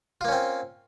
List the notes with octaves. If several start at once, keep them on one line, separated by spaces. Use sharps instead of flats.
A#3 C4 C#4 F4